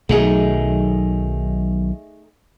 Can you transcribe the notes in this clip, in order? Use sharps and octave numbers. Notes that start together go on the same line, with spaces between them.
B1 D#3 F#3 A3 D#4 G#4